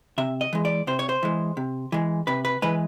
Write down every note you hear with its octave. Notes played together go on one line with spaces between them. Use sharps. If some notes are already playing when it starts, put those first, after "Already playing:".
C3 E5
D#5
E3 G#3
D5
C3 C5
C#5
C5
E3 G#3
C3
E3 G#3
C3 B4
B4
E3 G#3 B4